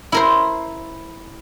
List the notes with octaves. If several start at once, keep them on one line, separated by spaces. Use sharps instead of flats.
E4 A#4 C5